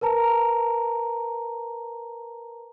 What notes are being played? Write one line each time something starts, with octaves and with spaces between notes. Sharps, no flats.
A#4 B4 A5 A#5